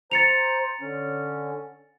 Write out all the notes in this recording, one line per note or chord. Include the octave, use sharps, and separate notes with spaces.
C5 A#5 A6 C#7 F7
D3 C#4